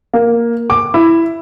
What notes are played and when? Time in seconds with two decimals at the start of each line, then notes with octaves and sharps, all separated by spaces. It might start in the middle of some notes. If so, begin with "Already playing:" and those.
0.13 A#3
0.70 D6
0.94 E4